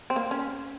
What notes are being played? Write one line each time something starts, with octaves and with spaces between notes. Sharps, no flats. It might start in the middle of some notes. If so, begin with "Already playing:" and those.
C4
A#3
C#4